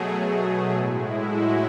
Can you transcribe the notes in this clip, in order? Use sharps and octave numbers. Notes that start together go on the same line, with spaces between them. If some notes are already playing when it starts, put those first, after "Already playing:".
Already playing: B2 F#3 A3 G#4
A2 G#3 E4
F#4